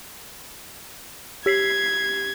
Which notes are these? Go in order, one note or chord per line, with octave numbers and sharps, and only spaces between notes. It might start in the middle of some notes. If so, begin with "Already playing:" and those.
G4 G#6 B6 C7